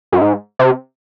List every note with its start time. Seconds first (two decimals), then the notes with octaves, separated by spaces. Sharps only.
0.12 F#2
0.21 G#2
0.59 C3